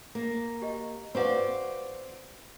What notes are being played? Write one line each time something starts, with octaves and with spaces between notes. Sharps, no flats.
A#3
G4 D#5
C4 F#4 B4 D5 F5